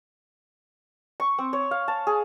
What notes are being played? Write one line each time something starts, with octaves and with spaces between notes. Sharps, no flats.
C#6
C4
C#5
F5
A5
G#4